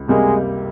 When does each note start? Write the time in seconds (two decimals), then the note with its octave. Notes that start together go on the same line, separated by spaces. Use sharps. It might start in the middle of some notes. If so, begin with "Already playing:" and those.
Already playing: C#2
0.08 C3 G3 G#3 A#3